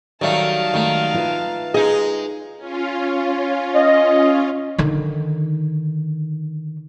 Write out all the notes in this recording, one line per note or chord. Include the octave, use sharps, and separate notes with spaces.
D#3 F#3 G3 A3 F5 A5
D#3 G#3 A3 G5
F4 B4 E5
G#3 D#4 G#4 D#5
C#4 F4
D#5
D3 D#3